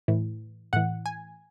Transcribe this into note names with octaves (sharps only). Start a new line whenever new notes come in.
A2 E3
A2 E3 F#5
G#5